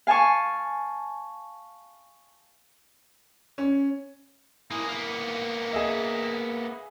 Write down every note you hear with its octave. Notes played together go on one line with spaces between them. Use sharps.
F5 G#5 A5 C#6
C#4
A#3 E4 G#4
A#3 B3
G#4 D#5 E5